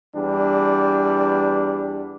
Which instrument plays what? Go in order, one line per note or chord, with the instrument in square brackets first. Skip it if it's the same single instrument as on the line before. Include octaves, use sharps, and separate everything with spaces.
[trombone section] E2 G3 D4